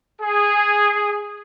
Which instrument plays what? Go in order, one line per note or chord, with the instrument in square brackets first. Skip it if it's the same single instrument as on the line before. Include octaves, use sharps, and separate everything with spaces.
[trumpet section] G#4